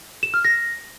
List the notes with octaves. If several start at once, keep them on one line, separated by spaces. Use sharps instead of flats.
E7
F6
A#6